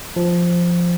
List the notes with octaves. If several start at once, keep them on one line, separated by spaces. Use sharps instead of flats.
F3